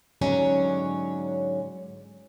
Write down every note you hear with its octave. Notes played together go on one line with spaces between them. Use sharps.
G#2 D3 F#3 C#4